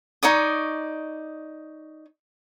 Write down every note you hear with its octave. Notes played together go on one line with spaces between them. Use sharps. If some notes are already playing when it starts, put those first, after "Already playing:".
D#4 C#5 D5 D#6